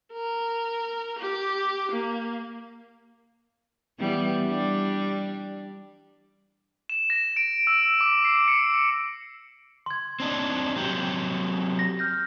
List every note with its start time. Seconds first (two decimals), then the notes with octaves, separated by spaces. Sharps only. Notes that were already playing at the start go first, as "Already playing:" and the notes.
0.13 A#4
1.19 G4
1.91 A#3
4.00 E3 G3 B3
4.47 G3 D4
6.89 E7
7.10 A#6
7.36 D7
7.67 E6
8.01 D6
8.25 C7
8.48 C#7
9.86 C6 G#6
10.20 C4 D4 D#4
10.76 F#3 C4 G4
11.79 A#6
11.99 F6 G6 A#6